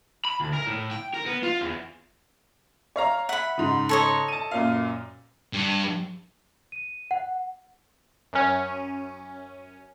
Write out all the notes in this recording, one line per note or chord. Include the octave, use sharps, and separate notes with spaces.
B5
D2
A#4
A2
G5
A#4
B3
F4
E2
C#5 F5 A#5
E5 F#5 B5
G#2 C#3
A4 C#5 D#5
A5 D#7
F#2 A#2 F5
G2
D#7
F#5
F#2 C#4